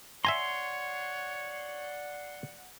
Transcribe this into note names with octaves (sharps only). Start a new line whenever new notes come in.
C#5 D5 E5 F#5 G#5 A#5 C6